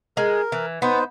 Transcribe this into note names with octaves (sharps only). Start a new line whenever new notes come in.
G#3 A#4
E3
B3 D#4 B4 C5